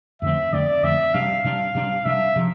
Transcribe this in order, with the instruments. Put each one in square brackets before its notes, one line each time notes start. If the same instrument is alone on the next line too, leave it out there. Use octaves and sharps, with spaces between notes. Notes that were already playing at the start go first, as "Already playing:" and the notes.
[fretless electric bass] F2 D3 A3 C4 [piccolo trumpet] E5
[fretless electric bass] F2 D3 A3 C4 [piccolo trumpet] D5
[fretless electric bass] F2 D3 A3 C4 [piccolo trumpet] E5
[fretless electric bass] C3 G3 D4 [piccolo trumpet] F5
[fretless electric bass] C3 G3 D4
C3 G3 D4
[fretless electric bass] C3 G3 D4 [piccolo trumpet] E5
[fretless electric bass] C3 F3